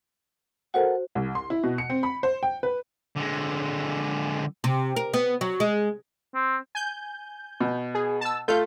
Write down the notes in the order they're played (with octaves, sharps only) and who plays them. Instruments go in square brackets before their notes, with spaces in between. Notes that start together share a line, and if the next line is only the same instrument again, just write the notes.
[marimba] F#4 C5 [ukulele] A4 A#4 F#5
[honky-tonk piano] C2
C6
E4
B2
C#7
C4
B5
C5
G5
B4
[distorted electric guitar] D3 G#3
[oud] C3
A#4
B3
F#3
G#3
[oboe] C4
[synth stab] G#5 G6
[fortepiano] B2
[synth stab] G#4
A5 E6
[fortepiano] A3 F4 A4 [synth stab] F5 G6